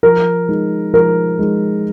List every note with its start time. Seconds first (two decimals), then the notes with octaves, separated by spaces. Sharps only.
0.03 F3 A#4
0.48 G#3 D#4
0.94 F3 A#4
1.39 G#3 D#4